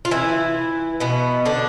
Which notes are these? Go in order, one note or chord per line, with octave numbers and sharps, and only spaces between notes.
F4
E3 E4
B2 B3
D3 D4